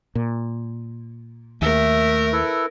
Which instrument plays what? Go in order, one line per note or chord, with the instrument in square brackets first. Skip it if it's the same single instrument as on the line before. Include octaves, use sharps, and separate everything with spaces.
[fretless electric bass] A#2
[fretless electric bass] D#2 [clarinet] A3 [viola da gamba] A#4 [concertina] E5
[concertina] E4 A4 B4